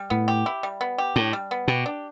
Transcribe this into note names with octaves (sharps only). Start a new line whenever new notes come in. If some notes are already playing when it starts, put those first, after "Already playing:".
Already playing: G3
A2 B3
G4
E4
G3
B3
G4
A2 D4
G3
B3
B2 G4
D4